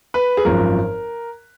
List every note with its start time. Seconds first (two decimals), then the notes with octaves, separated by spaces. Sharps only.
0.14 B4
0.37 G#4
0.45 G#1 F#2 F3 A#4